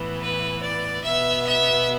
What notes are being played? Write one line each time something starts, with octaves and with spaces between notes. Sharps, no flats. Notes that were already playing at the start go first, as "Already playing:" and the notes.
Already playing: A2 E3 B3
B4
D5
B2 B3 E5
E5